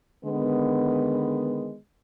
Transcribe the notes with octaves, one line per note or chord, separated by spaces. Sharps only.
D3 D#3 G#3 B3